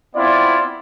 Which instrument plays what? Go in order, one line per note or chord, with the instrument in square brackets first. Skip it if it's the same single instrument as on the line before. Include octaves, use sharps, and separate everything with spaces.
[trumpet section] B3 C4 E4 F4 D5